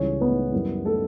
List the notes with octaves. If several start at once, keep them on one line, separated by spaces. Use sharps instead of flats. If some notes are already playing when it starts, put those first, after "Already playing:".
Already playing: C#2 C#3 E3 G3 C#4 C#5
B3 B4
F#2 E3 G3
A3 A4